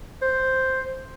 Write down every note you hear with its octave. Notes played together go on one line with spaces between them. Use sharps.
C5